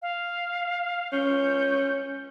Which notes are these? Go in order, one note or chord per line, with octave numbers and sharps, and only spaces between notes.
F5
C#4 G6